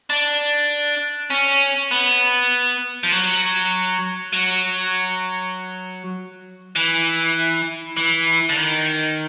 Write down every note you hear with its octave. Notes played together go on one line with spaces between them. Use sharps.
D4
C#4
B3
F3
F#3
F#3
E3
E3
D3
D#3